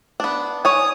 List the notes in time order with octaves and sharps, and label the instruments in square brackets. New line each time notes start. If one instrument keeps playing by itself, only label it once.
[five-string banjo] B3 D4
[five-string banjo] C#5 G#5 [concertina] D#6